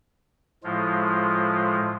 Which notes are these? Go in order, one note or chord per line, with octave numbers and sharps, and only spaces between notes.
A2 F3 G#3 F4